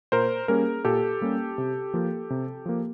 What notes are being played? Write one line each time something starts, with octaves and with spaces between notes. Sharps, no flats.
A#2 A#4 C5
G3 A#3 C#4 G#4 A#4
A#2 G4 A4
G3 A#3 C#4
C3
F3 A#3
C3
F3 A#3